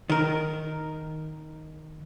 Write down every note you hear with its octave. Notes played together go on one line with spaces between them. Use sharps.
D#3 A#4